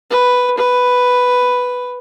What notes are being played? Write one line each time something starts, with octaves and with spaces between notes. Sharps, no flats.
B4
B4